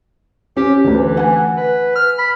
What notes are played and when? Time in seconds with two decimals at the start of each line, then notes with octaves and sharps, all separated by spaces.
0.57 C#4 G4
0.84 D2 D3 E3
1.17 F#5 G#5
1.57 B4
1.95 F6
2.18 B5